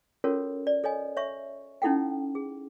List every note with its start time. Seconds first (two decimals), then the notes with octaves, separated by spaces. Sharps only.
0.24 C#4 F4 F#4 A4 A#4 C#5
0.67 D5
0.84 A4 C#5 D#5 G#5
1.17 C#5 E5 C#6
1.82 C#4 D#4 E4 A4 F#5 G5
2.35 G#4